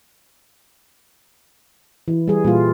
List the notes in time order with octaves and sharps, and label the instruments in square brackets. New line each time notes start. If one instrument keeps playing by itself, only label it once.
[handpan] E3
G3 G#4
A#2 G3 F4